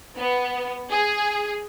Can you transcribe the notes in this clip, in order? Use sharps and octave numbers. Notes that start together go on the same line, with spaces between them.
B3
G#4